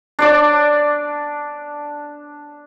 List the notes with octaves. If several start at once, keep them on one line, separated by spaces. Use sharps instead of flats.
D4 D5 D6